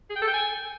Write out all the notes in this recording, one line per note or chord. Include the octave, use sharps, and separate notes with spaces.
G#4
G5
A4
G5
G#5